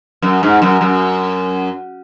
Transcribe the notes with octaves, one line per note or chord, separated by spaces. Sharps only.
F#2
G#2
F#2
F#2